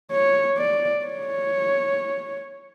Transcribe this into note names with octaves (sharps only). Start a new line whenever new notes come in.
C#5
D5
C#5